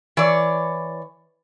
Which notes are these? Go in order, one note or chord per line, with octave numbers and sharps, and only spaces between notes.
E3 C#5 D5